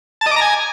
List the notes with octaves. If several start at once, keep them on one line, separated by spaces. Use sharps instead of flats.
A5
D#5
D6
A#5
G#5